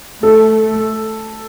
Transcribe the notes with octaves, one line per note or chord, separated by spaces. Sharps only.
A3 A4